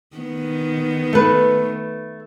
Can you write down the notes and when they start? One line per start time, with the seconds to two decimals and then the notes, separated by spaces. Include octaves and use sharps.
0.17 D#3 B3
1.13 A3 B4